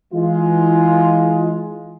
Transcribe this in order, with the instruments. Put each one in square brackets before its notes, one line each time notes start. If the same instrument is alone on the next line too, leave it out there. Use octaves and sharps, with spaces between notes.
[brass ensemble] E3 G#3 F4